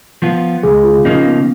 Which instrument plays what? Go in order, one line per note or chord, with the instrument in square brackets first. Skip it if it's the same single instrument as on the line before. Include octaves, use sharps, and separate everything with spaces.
[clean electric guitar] F3 B3 F4
[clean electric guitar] C#2 [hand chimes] G#4
[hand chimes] F4
[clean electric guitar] C#3 F3 A#3 D#4 [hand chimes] C#4
[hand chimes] B3